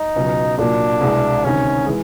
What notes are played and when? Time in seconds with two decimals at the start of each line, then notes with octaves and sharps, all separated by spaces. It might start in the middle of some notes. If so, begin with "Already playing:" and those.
Already playing: D#4
0.16 C#2 B2 F#3
0.58 C2 A#2 F#3 A#3 D4
1.01 C2 B2 G#3 B3 E4
1.43 D2 C3 D#3 C#4
1.86 E3 G#3